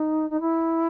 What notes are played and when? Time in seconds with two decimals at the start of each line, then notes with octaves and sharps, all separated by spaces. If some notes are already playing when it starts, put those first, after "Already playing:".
Already playing: D#4
0.30 D#4
0.40 E4